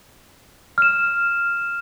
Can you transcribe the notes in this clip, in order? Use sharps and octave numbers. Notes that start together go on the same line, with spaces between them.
F6 E7